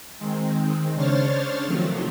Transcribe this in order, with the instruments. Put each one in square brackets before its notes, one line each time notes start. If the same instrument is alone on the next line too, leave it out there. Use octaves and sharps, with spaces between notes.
[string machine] D#3 G#3 C4
C#3 D4 C5 C#5 F6 A6
C3 D#3 F3 F#3 A3 C4